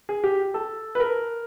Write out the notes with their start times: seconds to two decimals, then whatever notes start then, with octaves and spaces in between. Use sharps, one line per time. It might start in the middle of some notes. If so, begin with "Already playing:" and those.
0.09 G#4
0.24 G4
0.54 A4
0.95 B4
1.00 A#4